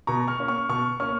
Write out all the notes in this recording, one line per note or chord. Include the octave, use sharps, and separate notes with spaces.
B2 A#5 C#6
C#6 F6
A#3 C#4
C#6 F6
B2 C#6 F6
A#3 C#4 C#6 F6